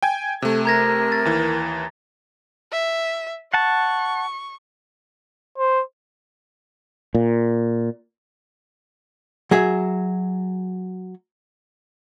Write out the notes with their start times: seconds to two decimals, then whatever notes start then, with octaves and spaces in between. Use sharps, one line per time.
0.02 G5 G#5 G#6
0.42 C3 A3 A4
0.65 A#4 A#5 G#6 A#6
1.12 A6
1.25 D#2 E3
2.72 E5
3.54 F#5 A5 C#6
5.58 C5
7.15 A#2
9.51 F#3 G#4 E5